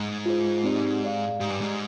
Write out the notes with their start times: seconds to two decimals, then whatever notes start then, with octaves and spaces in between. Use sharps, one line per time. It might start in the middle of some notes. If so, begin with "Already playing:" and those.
Already playing: G#2
0.26 F4 G#4 C5
0.64 C4 D#4 G4 D5
1.02 G#4 D5 F5
1.40 G#2 G4 D5 G#5
1.50 G2
1.61 G#2